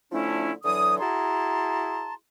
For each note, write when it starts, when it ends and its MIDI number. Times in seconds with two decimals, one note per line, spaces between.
0.12 0.52 50
0.12 0.52 53
0.12 0.52 57
0.12 0.52 61
0.12 0.52 62
0.12 0.52 64
0.64 0.99 50
0.64 0.99 52
0.64 0.99 54
0.64 0.99 87
0.99 2.13 64
0.99 2.13 66
0.99 2.13 68
0.99 2.13 81
0.99 2.13 82
0.99 2.13 84